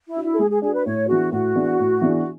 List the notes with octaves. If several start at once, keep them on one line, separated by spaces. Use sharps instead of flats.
E4
D4 F#4
E4
A4
G#3 G#4
G#4
D4 F#4 G#4
B4
A2 C#5
E3 B3 D4 F#4 G#4
A2 F#4
E3 B3 D4 G#4
A2
E3 B3 D4 G#4